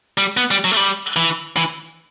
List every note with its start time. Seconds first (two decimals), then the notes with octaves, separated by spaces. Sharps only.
0.18 G3
0.37 B3
0.51 G3
0.64 F#3
0.72 A3
0.77 G3
1.16 E3
1.57 E3